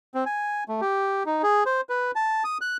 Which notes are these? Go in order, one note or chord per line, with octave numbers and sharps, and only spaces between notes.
C4
G#5
A3
G4
D#4
G#4
C5
B4
A5
D#6
F#6